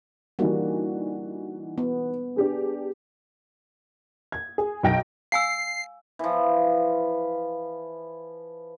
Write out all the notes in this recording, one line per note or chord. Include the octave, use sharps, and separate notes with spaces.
E3 G3 A#3 D4 D#4 F#4
B3
D4 G4 G#4
G#6
G#4
B1 G5 A#6 D7
F5 G#5 E6 C7
E3 F3